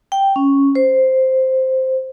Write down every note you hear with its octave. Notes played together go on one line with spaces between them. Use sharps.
G5
C#4
C5